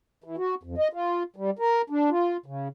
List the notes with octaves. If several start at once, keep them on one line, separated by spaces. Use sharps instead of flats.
E3
F#4
F2
D#5
F4
G3
A#4
D4
F4
C#3